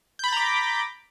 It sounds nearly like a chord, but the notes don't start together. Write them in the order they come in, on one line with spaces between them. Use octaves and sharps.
G6 B5 A6 A#5 D6